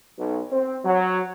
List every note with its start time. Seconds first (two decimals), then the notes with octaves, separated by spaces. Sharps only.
0.18 B1
0.51 C4
0.84 F#3